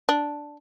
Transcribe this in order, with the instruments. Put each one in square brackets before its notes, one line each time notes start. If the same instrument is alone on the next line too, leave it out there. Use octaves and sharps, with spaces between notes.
[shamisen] D4